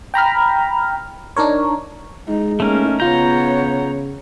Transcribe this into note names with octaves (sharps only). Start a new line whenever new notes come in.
G5 A#5 B5 F6
D4 D#4 A#4 C#5
G#3 D#4
A3 A#3 C#4 D#4 A#4
C#3 B3 F4 C#5 A#5 G6